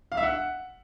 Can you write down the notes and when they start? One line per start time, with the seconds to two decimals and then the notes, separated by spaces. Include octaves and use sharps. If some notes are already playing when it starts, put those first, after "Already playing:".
0.12 F5
0.17 E5
0.23 F#5